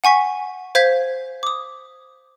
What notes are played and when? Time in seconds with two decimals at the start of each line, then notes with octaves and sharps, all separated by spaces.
0.04 F#5 G#5 C#6 B6
0.75 C5 F5 G6 G#6 B6
1.43 D6 D#6